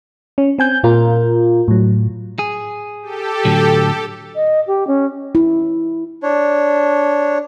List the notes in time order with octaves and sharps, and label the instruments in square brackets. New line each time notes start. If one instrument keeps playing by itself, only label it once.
[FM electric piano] C#4
C4 G#5 G6
A#2 F4 A#4
A2 F#3
[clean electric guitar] G#4
[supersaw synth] G4 A4
[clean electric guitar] A2 D3 F#3
[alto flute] D#5
G4
C#4
[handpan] E4
[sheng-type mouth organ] D4 C#5